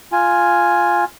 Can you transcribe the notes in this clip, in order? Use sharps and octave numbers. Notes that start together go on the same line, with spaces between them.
F4 G#5